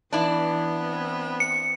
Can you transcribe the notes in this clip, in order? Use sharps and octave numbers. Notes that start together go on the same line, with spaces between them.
E3 B3 D4 E4
C4
C#7